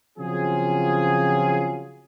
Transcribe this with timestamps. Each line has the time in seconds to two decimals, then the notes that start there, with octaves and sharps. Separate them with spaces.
0.18 C#3 F3 F#3 C4 F4 G#4